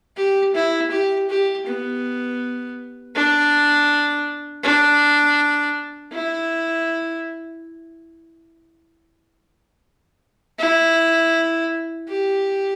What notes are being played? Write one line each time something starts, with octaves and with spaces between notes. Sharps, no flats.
G4
E4
G4
G4
B3
D4
D4
E4
E4
G4